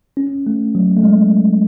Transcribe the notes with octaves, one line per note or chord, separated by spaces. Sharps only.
C#4
A3
F#3
A3
G#3